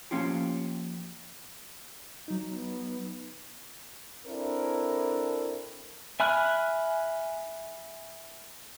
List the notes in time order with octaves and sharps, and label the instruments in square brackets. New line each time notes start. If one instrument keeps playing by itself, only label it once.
[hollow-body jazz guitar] F3 A#3 C#4 F4 G4
[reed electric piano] F#3 D#4
[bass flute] B3
[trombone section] C4 D4 E4 A4 A#4
[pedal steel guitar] E5 G#5 B5 F6 F#6